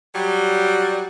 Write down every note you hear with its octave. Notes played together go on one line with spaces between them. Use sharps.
F#3 G3